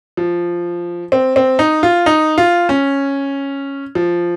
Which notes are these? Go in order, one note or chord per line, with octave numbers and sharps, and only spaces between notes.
F3
C4
C4
D#4
F4
D#4
F4
C#4
F3